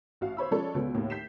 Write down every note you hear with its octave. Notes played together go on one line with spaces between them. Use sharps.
A1 F#4 F5
C5 C#5 B5 E6
F3 G#3 C#4 A4 C#5 D5
C#2 B2 B3
D#2 A2 A#3
G6 B6 C7 E7